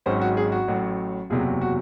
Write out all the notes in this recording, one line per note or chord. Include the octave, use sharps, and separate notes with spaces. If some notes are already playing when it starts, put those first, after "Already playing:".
G#1 G#2 F#3 C#4 C5
F#4
G#4
F#4
A1 A2 F#3
F#1 E2 C3 F#3 G#4
F#4